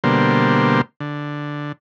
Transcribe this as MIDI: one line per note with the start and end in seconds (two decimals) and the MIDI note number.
0.04 0.81 47
0.04 0.81 50
0.04 0.81 55
0.04 0.81 58
0.04 0.81 72
1.00 1.72 50